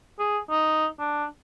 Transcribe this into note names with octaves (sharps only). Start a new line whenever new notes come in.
G#4
D#4
D4